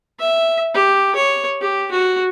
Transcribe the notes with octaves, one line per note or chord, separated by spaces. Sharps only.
E5
G4
C#5
G4
F#4